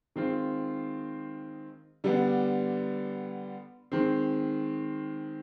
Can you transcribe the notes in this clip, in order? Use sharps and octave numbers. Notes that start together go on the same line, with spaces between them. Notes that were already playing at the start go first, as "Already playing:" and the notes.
D#3 G#3 C4 F4
D3 G3 B3 D4
D#3 G#3 C4